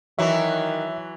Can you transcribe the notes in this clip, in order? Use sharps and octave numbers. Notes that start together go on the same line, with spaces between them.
D#3 E3 F#3 F#4 E5